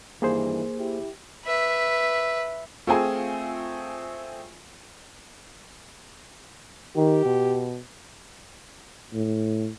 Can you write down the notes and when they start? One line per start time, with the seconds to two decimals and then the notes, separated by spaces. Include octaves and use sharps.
0.22 G2 D#3 E3 A#3 G#4 C5
0.78 E4 G4
1.45 B4 E5
2.87 A3 C4 F4 G#4 G#5
6.96 D#3 G4
7.25 B2
9.14 A2